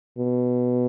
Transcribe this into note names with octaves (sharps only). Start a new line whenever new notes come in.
B2